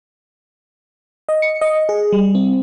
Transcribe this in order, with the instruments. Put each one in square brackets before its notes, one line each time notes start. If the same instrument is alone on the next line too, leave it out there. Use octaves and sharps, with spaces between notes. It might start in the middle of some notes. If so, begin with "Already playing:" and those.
[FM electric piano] D#5
C#7
D#5
G#4
G3
C4